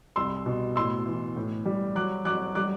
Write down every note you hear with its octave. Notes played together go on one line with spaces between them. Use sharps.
C2 C6 E6
B2
A2 C6 E6
E3
A2
G3
F#3 D6 F#6
F#3 D6 F#6
G3 D6 F#6